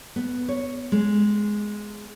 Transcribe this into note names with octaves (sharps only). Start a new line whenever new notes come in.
B3
C#5
G#3